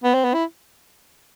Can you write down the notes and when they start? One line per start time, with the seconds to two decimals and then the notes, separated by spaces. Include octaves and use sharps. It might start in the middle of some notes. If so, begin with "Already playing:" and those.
0.04 B3
0.14 C4
0.24 B3
0.34 E4